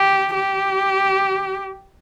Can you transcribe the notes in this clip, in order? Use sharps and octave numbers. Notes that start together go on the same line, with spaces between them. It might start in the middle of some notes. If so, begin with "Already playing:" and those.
Already playing: G4
G4